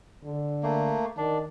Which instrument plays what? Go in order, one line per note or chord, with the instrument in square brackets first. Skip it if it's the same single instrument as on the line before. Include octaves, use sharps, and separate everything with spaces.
[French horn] D3
[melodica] A3 A#3
[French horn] D#3 [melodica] D4